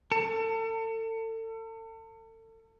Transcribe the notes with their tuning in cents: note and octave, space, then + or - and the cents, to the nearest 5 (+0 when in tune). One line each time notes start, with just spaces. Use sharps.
A4 +35